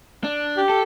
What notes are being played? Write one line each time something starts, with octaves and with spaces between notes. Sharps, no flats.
D4
G4
A4